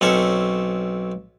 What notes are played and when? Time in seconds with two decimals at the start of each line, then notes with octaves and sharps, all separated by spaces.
0.01 B1 C4 C#4 A4 E5 C#6